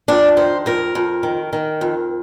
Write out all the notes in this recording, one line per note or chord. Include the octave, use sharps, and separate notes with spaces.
F2 D4
D#3 C5
F2 A#4
F2
D#3
D#3
F2